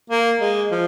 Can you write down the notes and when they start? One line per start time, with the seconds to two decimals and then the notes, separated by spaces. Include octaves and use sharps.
0.10 A#3
0.41 G#3
0.72 F3